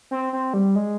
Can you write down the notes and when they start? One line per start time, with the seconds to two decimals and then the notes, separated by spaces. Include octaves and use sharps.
0.11 C4
0.33 C4
0.54 G3
0.76 G#3